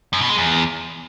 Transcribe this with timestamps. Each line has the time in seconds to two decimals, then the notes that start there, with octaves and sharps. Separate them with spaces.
0.13 F#2
0.21 B2
0.29 G#3
0.38 E2